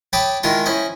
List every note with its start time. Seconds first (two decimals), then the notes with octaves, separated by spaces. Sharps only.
0.13 C#5 G5 A5 B5 D6 D#6
0.43 D#3 G#3 E4 F4 A#5 C6
0.66 C#4 E4 C5 D#5